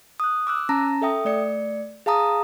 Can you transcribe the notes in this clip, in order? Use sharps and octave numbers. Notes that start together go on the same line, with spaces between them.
D#6 F#6
D6 E6 F#6
C#4 A5 A#5 A#6
A4 E5 G5 D#6
A3 D5 C#7
G#4 F5 A5 A#5 D#6